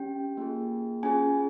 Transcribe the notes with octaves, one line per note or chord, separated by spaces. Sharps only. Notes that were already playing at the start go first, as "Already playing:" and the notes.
Already playing: C#4 G4 G5
A#3 F4 G#4
C#4 F4 G#4 G#5